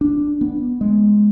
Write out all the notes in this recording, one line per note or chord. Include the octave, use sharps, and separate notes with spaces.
D4
B3
G#3